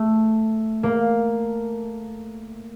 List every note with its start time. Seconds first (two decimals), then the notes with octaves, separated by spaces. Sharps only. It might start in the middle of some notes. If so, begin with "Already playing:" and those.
Already playing: A3
0.83 A#3